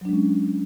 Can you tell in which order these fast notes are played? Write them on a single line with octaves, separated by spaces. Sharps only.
F#3 D4 G#3 C#4